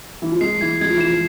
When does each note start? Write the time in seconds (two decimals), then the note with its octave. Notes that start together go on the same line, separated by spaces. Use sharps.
0.22 E3
0.32 F3
0.41 G#3 C7
0.61 E3 G#6
0.81 G#3 G#6
0.89 F3
0.97 E3
1.01 E7
1.06 F3